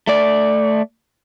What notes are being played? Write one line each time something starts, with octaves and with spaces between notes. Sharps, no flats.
A3 D5